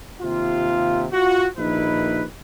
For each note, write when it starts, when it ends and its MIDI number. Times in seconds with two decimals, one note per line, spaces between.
0.21 1.05 39
0.21 1.05 48
0.21 1.05 65
1.13 1.47 65
1.13 1.47 66
1.58 2.25 34
1.58 2.25 39
1.58 2.25 63
1.58 2.25 64
1.58 2.25 71